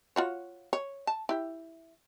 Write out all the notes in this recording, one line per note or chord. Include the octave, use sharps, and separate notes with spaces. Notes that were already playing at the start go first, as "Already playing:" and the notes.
F4 F#4 C#5
C#5
A5
E4 G4